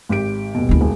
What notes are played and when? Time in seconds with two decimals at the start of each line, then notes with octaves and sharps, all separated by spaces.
0.09 G#1 G4 D7
0.54 D#1 B2
0.69 D2 E4
0.81 E1